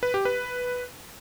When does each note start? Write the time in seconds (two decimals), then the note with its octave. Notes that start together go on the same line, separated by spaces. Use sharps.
0.03 B4
0.14 G4
0.25 B4